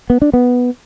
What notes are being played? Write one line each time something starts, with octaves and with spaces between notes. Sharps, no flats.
B3
D4
B3